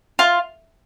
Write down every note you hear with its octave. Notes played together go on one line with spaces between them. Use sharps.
F4